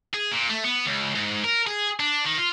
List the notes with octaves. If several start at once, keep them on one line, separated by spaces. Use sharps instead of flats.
G#4
A#2
A3
B3
C#2
G#2
A#4
G#4
D4
D#3
F4